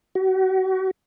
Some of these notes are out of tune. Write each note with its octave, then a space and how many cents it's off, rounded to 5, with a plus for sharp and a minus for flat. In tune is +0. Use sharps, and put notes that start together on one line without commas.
F#4 +35